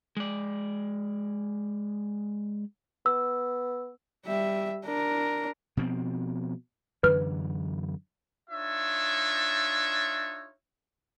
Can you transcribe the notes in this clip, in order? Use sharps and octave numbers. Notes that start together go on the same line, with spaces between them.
G#3 D5
B3 E6
G3 E5
D4 A#4
B2 F3 C4
F#2 D3 E3 B4 F6
D4 D#4 F4 C#5 E5